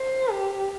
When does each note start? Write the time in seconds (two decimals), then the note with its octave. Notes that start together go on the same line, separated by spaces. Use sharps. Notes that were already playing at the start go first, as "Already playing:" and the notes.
Already playing: C5
0.31 G4